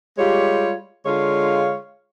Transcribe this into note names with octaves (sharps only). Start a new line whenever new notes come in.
G3 G#3 F4 G4 C#5
D3 G#3 F4 C#5 F5